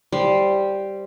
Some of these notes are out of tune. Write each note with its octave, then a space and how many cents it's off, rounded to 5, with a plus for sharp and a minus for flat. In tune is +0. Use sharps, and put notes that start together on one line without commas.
G3 +0 C5 +0